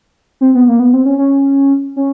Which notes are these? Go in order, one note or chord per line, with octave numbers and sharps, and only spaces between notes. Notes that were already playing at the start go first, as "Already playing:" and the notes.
C4
B3
A#3
B3
C4
C#4
C#4
C#4